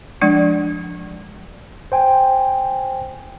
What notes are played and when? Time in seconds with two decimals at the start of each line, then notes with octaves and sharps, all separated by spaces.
0.21 F3 G#3 D4 D5
1.92 C5 G5 G#5